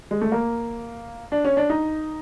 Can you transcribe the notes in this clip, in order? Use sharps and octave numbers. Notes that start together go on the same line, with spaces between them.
G#3
A3
A#3
D4
C#4
D4
D#4